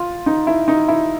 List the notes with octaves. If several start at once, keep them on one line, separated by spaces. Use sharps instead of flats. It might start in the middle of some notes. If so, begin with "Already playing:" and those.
Already playing: F4
D#4
E4
D#4
E4